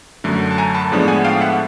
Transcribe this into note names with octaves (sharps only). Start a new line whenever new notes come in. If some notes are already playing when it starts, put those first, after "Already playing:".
F#2 D3 F#3 A3
A5
G#5 A#5
A5 B5
A2 F3 G#3 B3 D4
F#5 G#5
F5 G5
E5 F#5